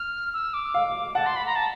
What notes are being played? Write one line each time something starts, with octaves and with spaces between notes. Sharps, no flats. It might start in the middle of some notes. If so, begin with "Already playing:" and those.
Already playing: F6
E6
D6
F5
F#5 A5
C6
B5
A#5
A5